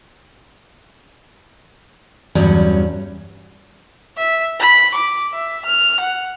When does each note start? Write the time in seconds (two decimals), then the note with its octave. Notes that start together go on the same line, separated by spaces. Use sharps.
2.35 E2 G2 C#3 F#3 G3 C#4
4.17 E5
4.60 B5
4.94 D6
5.33 E5
5.65 F6
6.00 F#5